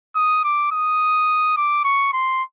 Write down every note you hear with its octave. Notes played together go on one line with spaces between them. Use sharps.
D#6
D6
D#6
D6
C#6
C6